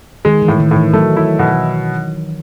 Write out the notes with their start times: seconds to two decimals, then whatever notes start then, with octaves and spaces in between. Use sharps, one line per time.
0.25 D#3 G#3
0.42 E3
0.48 A2
0.60 D#3
0.71 A2
0.76 E3
0.93 F#3 A3
1.17 E4
1.39 B2